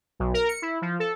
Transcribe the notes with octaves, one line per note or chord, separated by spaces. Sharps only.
B1
A#4
C#7
E4
F3
A4